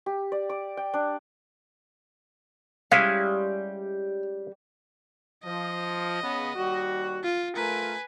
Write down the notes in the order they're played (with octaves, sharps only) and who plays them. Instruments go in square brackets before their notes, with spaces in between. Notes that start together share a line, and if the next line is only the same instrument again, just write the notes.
[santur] G4
D5
D6
G5
D4
[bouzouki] G3 [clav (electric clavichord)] G#3 C#4 E4 [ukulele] F5
[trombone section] F3 [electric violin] D#5
[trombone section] C#3 B3
D#2 G3 F#4
[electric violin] F4
[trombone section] A3 F4 A#4 [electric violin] B4 G#5